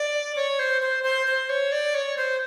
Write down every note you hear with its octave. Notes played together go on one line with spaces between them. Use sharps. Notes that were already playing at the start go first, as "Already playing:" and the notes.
Already playing: D5
C#5
C5
C5
C5
C5
C#5
D5
C#5
C5